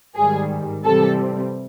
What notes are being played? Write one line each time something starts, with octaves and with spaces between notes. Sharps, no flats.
G#2 D#3 G3 G#4
C3 E3 G3 C4 A4